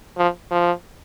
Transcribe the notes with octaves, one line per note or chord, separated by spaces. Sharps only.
F3
F3